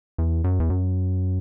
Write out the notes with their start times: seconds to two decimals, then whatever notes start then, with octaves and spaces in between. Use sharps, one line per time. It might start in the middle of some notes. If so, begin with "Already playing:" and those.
0.18 E2
0.44 F#2
0.60 E2
0.70 F#2